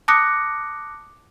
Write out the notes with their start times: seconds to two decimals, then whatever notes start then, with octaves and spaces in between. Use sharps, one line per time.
0.08 A5 D6 D#6 F#6 A#6 C#7